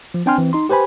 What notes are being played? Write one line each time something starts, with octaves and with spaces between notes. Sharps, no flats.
F3
C4 D4 G5 G#5 C6 F6
E3 C4
D#4 C6
G4 B4 C5 G#5 B5